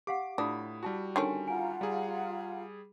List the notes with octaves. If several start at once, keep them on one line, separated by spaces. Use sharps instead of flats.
G4 F5 F#5 D6
A2 D4 F4 B5 D#6
G3 E4 F#4 A5
D3 D#3 C#4 G#5 A5 C6
F4 F#5 G#5 A#5
G3 G#4